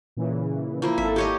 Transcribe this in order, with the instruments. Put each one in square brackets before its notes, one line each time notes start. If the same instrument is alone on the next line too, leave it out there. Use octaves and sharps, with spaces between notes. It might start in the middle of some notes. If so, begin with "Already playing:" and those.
[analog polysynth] A#2 C#3 E3
[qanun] F3 A#3 E4
[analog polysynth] G#1 A4 [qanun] E5
[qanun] G4 C#5 D#5